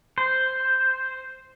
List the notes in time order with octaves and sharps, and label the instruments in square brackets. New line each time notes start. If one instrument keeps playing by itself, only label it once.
[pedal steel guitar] C5